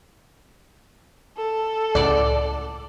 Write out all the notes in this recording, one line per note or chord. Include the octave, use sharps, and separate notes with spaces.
A4
C#2 A2 D5 F#5